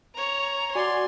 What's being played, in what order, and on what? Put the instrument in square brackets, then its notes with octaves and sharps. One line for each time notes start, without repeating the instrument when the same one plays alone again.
[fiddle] C#5 A#5
[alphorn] F#4 [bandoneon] D5 G#5 [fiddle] C6